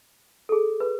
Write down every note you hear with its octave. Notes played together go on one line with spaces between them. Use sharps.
A4
G#4
B4